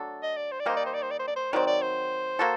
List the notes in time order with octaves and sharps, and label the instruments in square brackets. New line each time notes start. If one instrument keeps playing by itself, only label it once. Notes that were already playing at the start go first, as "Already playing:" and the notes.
Already playing: [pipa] F#3 A3 D4 A4
[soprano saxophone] D#5
D5
C5
D5
[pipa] D#3 G3 A#3 D#4 [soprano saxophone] C5
[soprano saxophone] D5
C5
D5
C5
D5
C5
D5
C5
[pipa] D#3 F#3 C4 [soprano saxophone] D5
[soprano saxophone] D5
C5
[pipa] A#3 F#4 A4